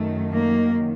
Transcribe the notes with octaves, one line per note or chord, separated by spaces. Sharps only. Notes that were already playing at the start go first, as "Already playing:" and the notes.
Already playing: F#2 D#3 A3
A#3